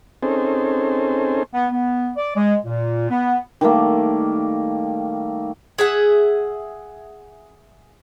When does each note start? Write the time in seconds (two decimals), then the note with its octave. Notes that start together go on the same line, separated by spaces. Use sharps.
0.23 C4 C#4 D#4 G#4 A4 C5
1.53 B3
1.70 B3
2.16 D5
2.36 G#3
2.65 A#2
3.10 B3
3.61 D#3 G3 A3 A#3
5.78 G#4 E5 F#5